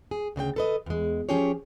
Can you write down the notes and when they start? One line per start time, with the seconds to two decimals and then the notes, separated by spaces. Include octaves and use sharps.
0.11 G#4
0.36 D2 C#3 A#4 G5
0.56 A4 B4 D#5
0.86 E2 G#3
1.29 F3 C#4 G4 G#4 C#5